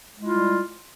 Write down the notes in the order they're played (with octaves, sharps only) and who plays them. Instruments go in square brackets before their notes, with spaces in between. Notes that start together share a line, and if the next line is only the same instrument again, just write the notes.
[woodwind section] G#3
E4
F4
G3